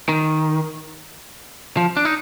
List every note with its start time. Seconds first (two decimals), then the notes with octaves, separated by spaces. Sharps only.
0.09 D#3
1.77 F3
1.97 D4
2.05 D#4